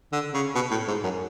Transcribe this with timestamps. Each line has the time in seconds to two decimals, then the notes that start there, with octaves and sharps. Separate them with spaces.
0.12 D3
0.34 C#3
0.55 B2
0.71 A2
0.88 G#2
1.04 F#2